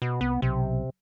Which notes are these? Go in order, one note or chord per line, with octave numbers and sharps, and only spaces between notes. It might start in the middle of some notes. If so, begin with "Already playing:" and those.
B2
C2 B3
B1 C3